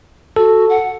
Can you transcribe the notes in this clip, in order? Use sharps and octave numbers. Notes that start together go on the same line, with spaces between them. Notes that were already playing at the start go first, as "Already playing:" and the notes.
F#4 A4
F#5